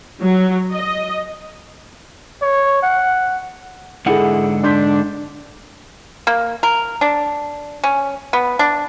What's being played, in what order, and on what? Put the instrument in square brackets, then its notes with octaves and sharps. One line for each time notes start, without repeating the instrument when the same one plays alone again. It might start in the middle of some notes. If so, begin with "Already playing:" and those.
[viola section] F#3
D#5
[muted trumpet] C#5
F#5
[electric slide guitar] G#2 D3 F#5 [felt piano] E4 G#4 A4
[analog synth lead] D4 [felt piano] C6 G6 B6
[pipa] A#3
A#4
D4
C#4
B3
D4